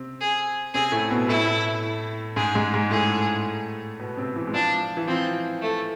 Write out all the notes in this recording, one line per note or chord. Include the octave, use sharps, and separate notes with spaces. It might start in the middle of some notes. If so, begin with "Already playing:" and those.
Already playing: C3 C4
G#4
C3 C4 G#4
A2 A3
B2 B3
A2 A3 E4
G#2 G#3 G#4
G#2 G#3
G#2 G#3
A2 A3 G#4
B2 B3
C3 C4
E3
G#3
F3 D4
E3
F3 C4
A3